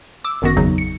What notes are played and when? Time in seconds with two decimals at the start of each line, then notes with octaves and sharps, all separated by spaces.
0.24 D6 E6
0.42 G1 F#2 D#3 B3 F#4 A#6
0.56 G#1 E2 C#3 F#3 D#4
0.78 C#7